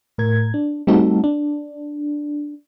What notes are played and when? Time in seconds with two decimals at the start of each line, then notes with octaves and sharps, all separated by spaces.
0.18 A2 A#4 G#6
0.54 D4
0.87 G3 A3 C4 D#4 F#4 A4
1.24 D4